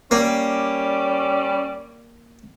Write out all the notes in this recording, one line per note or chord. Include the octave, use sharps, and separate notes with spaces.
G3 A#3 C#4 D5